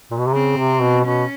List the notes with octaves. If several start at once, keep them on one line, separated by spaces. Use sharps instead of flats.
A#2
B2
C3
C#3 C4
C3
B2
B2 C#4